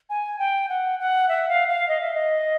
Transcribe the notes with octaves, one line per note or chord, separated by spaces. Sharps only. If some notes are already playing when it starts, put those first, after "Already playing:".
G#5
G5
F#5
F#5
E5
F5
F5
D#5
E5
D#5